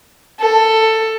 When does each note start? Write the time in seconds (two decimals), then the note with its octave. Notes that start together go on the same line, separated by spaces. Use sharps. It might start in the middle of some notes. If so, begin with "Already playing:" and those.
0.40 A4